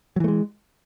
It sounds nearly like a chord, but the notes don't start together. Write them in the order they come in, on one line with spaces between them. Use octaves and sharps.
F#3 E3 A3 G#3